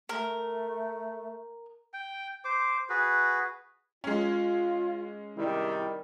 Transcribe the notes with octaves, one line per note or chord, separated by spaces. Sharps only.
A3 A#4
G5
C5 D6
F#4 G#4 B4
G#3 C#4 F4
C3 D#3 G3 E4